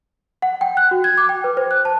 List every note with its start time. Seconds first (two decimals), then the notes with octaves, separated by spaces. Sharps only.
0.42 F#5
0.61 G5
0.77 F#6
0.91 F#4
1.04 G#6
1.18 D6
1.29 G5
1.44 B4
1.57 C5
1.71 F#6
1.85 A5